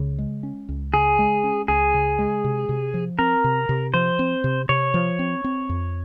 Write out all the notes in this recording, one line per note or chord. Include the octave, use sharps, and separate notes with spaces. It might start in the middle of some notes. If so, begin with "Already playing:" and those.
Already playing: C#2 C#3
G#3
C#4
C#2
C#3 G#4
G#3
C#4
C#2 G#4
C#3
G#3
C3
C3
F3
C4 A#4
C3
C3
F3 C5
C4
C3
C3 C#5
F3
C4
C4
F2